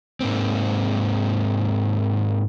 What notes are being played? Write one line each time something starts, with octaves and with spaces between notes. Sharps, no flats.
G#2 A#3 C4